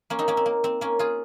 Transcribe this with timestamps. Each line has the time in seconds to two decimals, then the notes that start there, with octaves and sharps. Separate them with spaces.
0.10 A#3 C#4
0.19 C4 D#4
0.28 A#3 C#4
0.37 C4
0.46 A#3
0.64 C4
0.81 A#3 C#4
0.99 F4 G#4